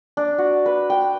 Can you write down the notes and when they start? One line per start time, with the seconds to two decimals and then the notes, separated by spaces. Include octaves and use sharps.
0.17 D4
0.38 F#4
0.66 B4
0.90 G5